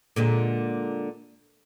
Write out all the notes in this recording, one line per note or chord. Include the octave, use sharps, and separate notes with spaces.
A#2 D3 G#3